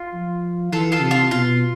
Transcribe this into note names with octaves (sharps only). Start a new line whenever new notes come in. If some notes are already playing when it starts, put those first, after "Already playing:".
Already playing: F4
F3
E3 F4 A4
F4 A4
C3
F4
B2 F4